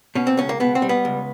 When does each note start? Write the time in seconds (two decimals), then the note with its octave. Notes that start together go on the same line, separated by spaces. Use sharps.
0.15 B2 C#4
0.27 C4
0.37 C#2 C#4
0.49 A#3
0.60 B2 B3
0.75 C4
0.82 G3
0.89 B3
1.05 C#2